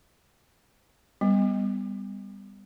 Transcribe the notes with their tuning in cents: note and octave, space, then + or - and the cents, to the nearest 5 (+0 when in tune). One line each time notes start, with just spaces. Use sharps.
G3 +20 B3 +20